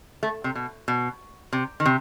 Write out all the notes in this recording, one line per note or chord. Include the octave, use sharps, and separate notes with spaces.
A3
C3
B2
B2
C3
D#3
C3